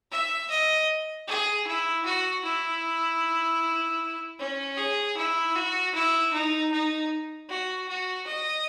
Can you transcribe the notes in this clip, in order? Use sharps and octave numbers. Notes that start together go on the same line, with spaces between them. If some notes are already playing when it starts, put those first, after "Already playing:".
E5
D#5
G#4
E4
F#4
E4
C#4
G#4
E4
F#4
E4
D#4
D#4
F#4
F#4
D#5